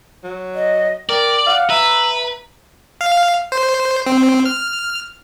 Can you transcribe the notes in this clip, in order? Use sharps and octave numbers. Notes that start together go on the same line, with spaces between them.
F#3
D#5
A#4 D5 G5
F5 F#5
B4 E5 A#5
F5
C5
C4
F6